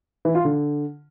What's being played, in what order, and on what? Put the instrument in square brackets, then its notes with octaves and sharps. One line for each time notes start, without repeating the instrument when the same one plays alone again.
[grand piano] E3
F4
D3